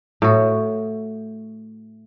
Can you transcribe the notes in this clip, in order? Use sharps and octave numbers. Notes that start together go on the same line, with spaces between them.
A2 F#4